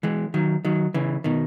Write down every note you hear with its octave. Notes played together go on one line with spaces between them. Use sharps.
E3 G#3
D#3 F#3
D#3 F#3
C#3 E3
B2 D#3